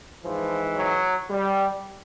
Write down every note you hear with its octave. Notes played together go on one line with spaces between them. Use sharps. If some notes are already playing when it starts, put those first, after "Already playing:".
G#2 E3 F3
F#3
G3